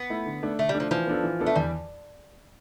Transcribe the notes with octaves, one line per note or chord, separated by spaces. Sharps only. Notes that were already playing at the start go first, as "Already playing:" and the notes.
Already playing: B3
A3 E4
D3
A3 D4
D3 A3
G3
A3 D4
F3
E3 F3
B3 D4 A4
E3
B3 D4 A4
A3
E2 G3